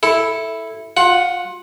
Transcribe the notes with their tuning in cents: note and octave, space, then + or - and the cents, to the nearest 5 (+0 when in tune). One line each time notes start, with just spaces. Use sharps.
E4 +0 A4 +0
F4 +25 F#5 +0